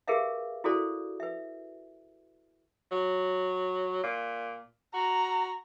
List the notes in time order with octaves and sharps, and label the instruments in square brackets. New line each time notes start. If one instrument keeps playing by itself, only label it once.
[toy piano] G4 G#4 A#4 B4 E5 F5
E4 F#4 G#4 A4 C5 D5
B4 E5
[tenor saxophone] F#3
A#2
[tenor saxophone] F#4 [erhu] A#5